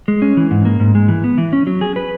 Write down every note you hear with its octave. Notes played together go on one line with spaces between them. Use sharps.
G#3
C#4
E3
G#2
A#3
G#2
G#3
E3
B3
E3
C#4
F#3
G#4
B4